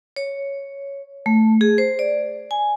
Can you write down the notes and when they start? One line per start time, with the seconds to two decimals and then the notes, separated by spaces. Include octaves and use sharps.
0.16 C#5
1.26 A3
1.61 G#4
1.78 C5
1.99 D5
2.51 G#5